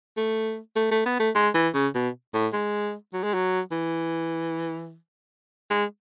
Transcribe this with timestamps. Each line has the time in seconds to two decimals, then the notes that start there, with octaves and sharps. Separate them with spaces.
0.17 A3
0.76 A3
0.91 A3
1.06 B3
1.19 A3
1.35 G#3
1.54 E3
1.74 C#3
1.95 B2
2.34 A2
2.53 G#3
3.13 F#3
3.24 G#3
3.34 F#3
3.71 E3
5.70 G#3